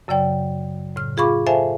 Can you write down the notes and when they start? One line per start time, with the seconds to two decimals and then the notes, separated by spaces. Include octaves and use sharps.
0.08 F#2 C#3 F#3 D5 G5
0.96 A2 C#3 F6
1.17 F4 G#4 F5 B5 C#6 D6
1.47 A4 C5 E5 F5 G#5 A5